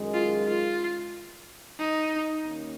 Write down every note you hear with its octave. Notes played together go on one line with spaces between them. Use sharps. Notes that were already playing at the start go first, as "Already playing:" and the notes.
Already playing: F#2 D#3 G#3
F4
F4
D#4
D#2 D#3 A#3 C#4